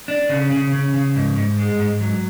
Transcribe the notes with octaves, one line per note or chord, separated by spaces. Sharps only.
D4
C#3
C#3
C#3
C#3
G#2
G#2
G#3
G#2
F#3